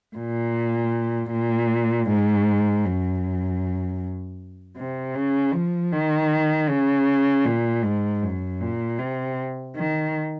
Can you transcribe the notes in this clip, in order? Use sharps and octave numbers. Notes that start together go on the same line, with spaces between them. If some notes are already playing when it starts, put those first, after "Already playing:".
A#2
A#2
G#2
F#2
C3
C#3
F3
D#3
C#3
A#2
G#2
F#2
A#2
C3
D#3